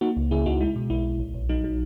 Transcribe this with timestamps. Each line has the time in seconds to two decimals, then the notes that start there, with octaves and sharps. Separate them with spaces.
0.01 A#3 D#4 F#4
0.17 C#2
0.31 C#3 E4 G#4
0.46 C#2 D#4 F#4
0.61 G#3 E4
0.76 B2
0.90 B1 E4
1.04 B1
1.19 A#1
1.34 A#1
1.49 F#3 D#4
1.64 F#3